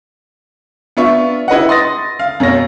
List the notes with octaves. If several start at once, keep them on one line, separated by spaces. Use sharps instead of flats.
B3 D4 F4 E5 C#6
E4 B4 D#5 F#5
C6 D#6 A6 A#6
F5
F#2 B2 C#4 A#6